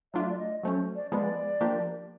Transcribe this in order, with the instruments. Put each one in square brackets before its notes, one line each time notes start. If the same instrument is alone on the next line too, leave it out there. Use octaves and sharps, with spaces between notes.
[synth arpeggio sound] F#3 A3 D4 F4 [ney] E5
[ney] D5
D#5
[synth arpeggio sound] F#3 A3 C#4 [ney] C5
[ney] D5
[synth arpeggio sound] F3 G#3 B3 [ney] D5
[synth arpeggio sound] F3 A#3 D4 G4